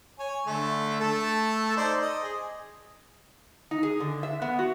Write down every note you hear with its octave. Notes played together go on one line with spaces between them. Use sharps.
C#5 G#5
D3 A3
A3 A4 A5
D#4 C5 D5
D#5
G#4
D#4
G#4
D3
E5
B3
F#4